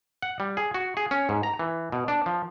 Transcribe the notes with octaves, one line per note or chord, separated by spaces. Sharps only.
F#5
G3
G#4
F#4
G#4
C#4
G#2
A#5
E3
B2
D4
F3